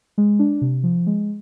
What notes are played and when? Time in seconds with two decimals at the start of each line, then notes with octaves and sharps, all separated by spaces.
0.18 G#3
0.39 D4
0.61 C3
0.83 F3
1.07 G#3